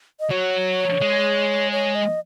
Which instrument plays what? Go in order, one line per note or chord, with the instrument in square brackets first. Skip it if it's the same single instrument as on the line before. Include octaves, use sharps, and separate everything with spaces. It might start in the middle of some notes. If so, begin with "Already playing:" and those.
[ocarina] D#5
[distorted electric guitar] F#3 [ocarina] C#5
[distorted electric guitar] G#3
[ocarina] C#5
D#5